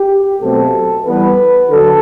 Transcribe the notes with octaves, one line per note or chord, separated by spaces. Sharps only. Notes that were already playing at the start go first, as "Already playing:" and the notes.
Already playing: G4
B2 F#3 A3 C4 A4
E3 G3 B3 B4
D3 F#3 A4